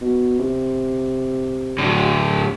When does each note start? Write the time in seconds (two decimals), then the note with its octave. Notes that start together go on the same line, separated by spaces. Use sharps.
0.01 B2
0.39 C3
1.78 A2 D3